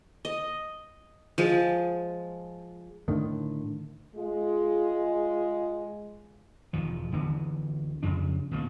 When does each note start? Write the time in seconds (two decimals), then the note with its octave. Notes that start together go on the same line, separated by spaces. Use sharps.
0.25 D#5
1.38 F3 G#3
3.08 A2 D3 D#3
4.15 G#3 F4
6.73 E1 D#3 F3
7.12 D1 D3 E3 B3
8.03 F2 C#3 D4
8.51 B2 D#3 A3 A#3